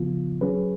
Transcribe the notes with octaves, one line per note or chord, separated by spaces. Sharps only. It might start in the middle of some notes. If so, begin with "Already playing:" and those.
Already playing: C#3 F3 B3 F4
F#3 C#4 G#4 B4